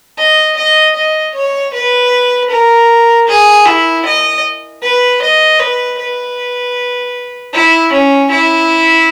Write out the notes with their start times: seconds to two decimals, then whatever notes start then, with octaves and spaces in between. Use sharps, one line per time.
0.18 D#5
0.57 D#5
0.96 D#5
1.34 C#5
1.73 B4
2.50 A#4
3.28 G#4
3.66 E4
4.05 D#5
4.82 B4
5.22 D#5
5.60 B4
5.99 B4
7.54 E4
7.92 C#4
8.31 E4